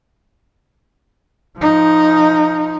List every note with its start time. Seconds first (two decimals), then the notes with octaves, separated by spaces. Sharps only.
1.58 F3 D#4